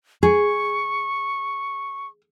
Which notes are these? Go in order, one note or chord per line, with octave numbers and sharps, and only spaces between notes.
G#4 C#6